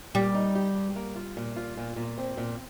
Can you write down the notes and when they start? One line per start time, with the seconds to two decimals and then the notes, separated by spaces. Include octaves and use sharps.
0.15 A#2 G3
0.34 D#4
0.55 G4
0.75 G2
0.96 A#3
1.16 F4
1.37 A#2
1.56 F4
1.77 A#2
1.96 A#2
2.18 C4
2.37 A#2